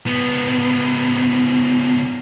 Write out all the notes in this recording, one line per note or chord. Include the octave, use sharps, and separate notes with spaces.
C#2 B3